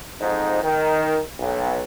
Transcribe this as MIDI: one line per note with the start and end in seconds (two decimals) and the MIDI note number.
0.20 0.57 41
0.20 0.57 44
0.20 0.57 53
0.20 0.57 63
0.62 1.18 51
1.39 1.80 35